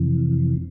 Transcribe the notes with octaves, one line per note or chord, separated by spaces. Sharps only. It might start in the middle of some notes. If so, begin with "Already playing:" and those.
Already playing: F2 C3 E3